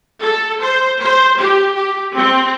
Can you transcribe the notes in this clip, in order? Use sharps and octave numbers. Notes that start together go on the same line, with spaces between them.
A4
C5
C5
G4
G4
C4